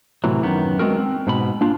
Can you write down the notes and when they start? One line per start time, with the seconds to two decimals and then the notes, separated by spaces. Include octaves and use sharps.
0.24 A2 C3 E3 F#3
0.43 F#2 D#3 B3
0.79 G#3 B3 C4 D4 F#4 A#4
0.98 C4
1.27 G#2 B2 B5
1.61 A#3 D4 F4